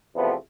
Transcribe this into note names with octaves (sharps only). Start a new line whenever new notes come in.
E2 C3 F3 A3 B3